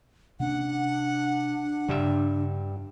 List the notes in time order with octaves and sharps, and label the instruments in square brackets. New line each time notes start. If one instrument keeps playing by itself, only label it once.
[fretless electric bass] C3 A#3 C#4 [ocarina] D4 [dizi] F#5
[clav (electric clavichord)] G2 G3 E5 [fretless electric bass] C#3